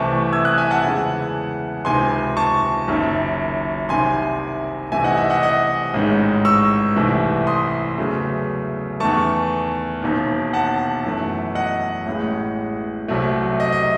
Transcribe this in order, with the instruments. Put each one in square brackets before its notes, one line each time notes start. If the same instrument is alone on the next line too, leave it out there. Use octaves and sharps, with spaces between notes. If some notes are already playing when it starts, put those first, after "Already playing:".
Already playing: [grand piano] C2 C3 E3 A3 A5 C#6
E6 G#6
D#6 F#6
E5 G#5
F#5 A5
E2 C#3 E3 G#3
C#2 C3 D#3 G#5 C6
A5 C#6
F#1 F#2 D#3
C2 C3 D#3 G#5 C6
C2 C3 E3 A3 E5 G#5
D#5 F#5
E5
D#5 F#5
D#5 F#5
A1 G#2 D#3 G#3
C#6 E6
C2 C3 E3 A3
C6 D#6
E2 C#3 F#3 A3
E2 D#3 A3 A5 C#6
E1 D#2 D#3
F#5 A5
F#2 E3 A3
D#5 F#5
A1 A2 G#3
C2 C3 F#3 A3
D#5
D#5